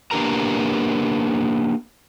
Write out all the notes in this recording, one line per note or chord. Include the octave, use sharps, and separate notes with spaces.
A#3 B3 D4 G4 A#4 A#5